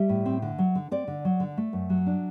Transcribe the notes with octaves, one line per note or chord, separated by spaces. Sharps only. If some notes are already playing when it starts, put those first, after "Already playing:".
Already playing: G3 E5
A2
C4
D3
F#3
D3
C4 D5
D3
F#3
D3
A3
F#2
F#3
D4